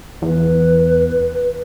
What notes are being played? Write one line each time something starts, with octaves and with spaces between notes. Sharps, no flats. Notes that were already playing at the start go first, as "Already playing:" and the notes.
E2 B4